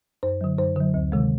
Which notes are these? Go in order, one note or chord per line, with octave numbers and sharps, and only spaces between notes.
F#2 C5
D3 F#3
F#2 C5
D3 F#3
D2
C3 D#3 G#3